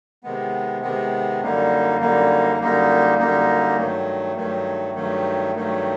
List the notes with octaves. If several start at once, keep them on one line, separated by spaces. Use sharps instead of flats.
C3 D#3 G#3 B3
C3 D#3 G#3 B3
F#2 D3 G3 A#3 D#4
F#2 D3 G3 A#3 D#4
F#2 D3 G3 A#3 D#4
F#2 D3 G3 A#3 D#4
G2 D#3 F#3 A3
G2 D#3 F#3 A3
G2 D#3 F#3 A3
G2 D#3 F#3 A3